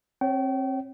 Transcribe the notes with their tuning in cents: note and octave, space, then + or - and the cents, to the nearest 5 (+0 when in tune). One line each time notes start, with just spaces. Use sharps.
C4 +35 C#5 +0 G5 -35